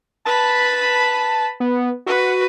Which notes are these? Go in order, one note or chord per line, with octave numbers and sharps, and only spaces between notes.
B4 A5 B5
B3
F#4 B4